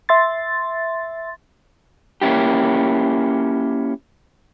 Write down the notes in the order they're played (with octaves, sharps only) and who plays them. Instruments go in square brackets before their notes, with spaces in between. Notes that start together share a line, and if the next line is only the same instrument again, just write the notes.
[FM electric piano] E5 C6 A6
[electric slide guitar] A#3 C#4 E4 G4